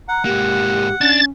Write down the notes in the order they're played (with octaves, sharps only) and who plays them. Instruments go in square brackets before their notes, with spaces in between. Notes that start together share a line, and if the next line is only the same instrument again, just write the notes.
[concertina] F#5 [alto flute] A#5
[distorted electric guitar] G#2 A#3 [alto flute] G4
[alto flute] C#4 [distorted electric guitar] D4 [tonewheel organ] A6